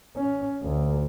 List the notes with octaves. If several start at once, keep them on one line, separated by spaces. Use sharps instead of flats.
C#4
D2